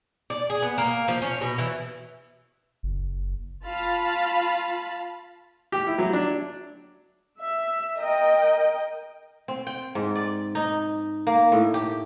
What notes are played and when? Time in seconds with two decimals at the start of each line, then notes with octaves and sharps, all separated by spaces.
0.30 D5
0.50 G#4
0.62 B3
0.78 A#3
1.08 F3
1.22 C#4
1.41 B2
1.58 E3
2.83 F#1
3.64 F4 F5 A5 B5
5.72 G4
5.87 E4
5.98 F#3
6.13 D4
7.39 E5
7.99 A#4 D#5 G5
9.48 C4
9.67 G5
9.95 G#2
10.16 D5
10.55 D#4
11.27 A#3
11.52 A2
11.74 G4